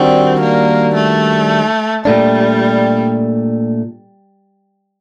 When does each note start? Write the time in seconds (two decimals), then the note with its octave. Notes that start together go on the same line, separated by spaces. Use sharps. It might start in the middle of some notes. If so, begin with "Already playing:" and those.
Already playing: D#3 G3 C4 D4 F#4
0.41 A#3
0.95 A3
2.05 A#2 G3 A3 D4